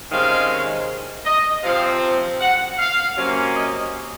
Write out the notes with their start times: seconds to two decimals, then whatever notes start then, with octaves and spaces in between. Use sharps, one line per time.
0.11 C3 D#3 G#3 C#4 F5
1.26 D#5
1.64 C3 F3 C4 F5
2.41 F#5
2.78 F5
3.17 C3 F#3 A#3 C#4
3.56 D#5